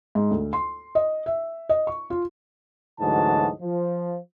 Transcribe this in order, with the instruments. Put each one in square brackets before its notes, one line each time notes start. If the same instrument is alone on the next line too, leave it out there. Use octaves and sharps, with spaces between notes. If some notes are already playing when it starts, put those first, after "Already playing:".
[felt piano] G#2
D2
C6
D#5
E5
D#5
C#6
F4
[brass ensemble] D2 G#2 E3 F#3 D#5 A5
F3